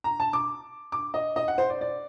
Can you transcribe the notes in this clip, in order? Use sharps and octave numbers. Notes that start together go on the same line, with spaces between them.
A#5
A5
D6
D6
D#5
D#5
F#5
C5
D5
D5